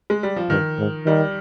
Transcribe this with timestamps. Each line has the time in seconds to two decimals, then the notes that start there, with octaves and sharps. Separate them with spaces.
0.10 G#3
0.23 G3
0.36 F3
0.49 G2 D#3
0.78 G#2
1.06 D#3 G3